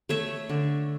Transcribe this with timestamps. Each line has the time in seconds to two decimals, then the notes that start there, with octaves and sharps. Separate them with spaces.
0.09 A3 C#5 E5
0.49 D3